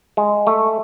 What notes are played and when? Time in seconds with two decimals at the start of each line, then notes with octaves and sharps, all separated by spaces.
0.17 G#3
0.47 A3